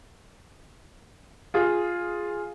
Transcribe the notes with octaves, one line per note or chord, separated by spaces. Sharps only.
F4 G#4